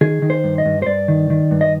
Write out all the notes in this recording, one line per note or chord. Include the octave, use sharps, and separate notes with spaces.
D#3 G#4
D#3
C5
G2
D#5
G2
C5
G2 D5
D#3
D#3
G2
D#5